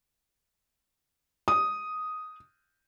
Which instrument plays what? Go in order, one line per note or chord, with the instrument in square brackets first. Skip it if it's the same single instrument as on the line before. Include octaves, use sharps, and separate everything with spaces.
[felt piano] D#6